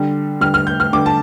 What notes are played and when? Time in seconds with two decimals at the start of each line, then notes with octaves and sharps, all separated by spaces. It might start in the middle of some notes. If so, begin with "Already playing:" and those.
Already playing: D3 G3
0.41 D3 G3 F6
0.54 F6
0.67 G6
0.80 F6
0.93 D3 G3 D6
1.06 A5